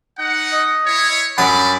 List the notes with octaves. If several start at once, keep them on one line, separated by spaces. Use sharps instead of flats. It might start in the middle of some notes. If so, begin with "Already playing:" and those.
D#4 F#5
D#5
E4 C#5
F#2 F#3 G3 D4 D5 B5 D#6